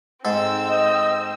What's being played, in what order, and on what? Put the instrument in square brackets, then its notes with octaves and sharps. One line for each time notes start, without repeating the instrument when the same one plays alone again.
[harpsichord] G#2 A4 [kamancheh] C4 E6
[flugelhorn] D#5